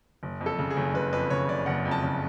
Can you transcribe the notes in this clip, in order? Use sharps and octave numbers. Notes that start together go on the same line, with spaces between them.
F#1
F2
A4
C#3
G#4
F#1
F#1 B4
F2 B4
C#3 C#5
F#1 D5
F#1 F#5
F2
A5
C#3